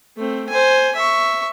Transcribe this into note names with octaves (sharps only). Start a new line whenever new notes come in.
A3 C4
C5 G#5
E5 C#6